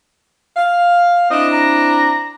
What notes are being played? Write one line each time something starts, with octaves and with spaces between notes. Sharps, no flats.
F5
C4 D4 E4 D#5
A#5